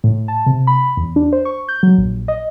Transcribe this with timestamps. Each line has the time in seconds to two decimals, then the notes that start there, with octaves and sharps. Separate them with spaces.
0.04 A2
0.28 A5
0.46 C3
0.67 B5
0.97 E2
1.16 D4
1.33 C5
1.45 C#6
1.69 G6
1.83 F#3
1.98 A#1
2.28 D#5